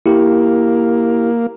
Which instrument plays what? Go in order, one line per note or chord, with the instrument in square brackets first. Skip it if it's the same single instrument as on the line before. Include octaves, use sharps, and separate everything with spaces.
[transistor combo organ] A#3 [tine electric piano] E4 G4